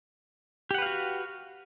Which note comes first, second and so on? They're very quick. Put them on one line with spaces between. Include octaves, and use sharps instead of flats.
G4 F#5 B4 F5 F#4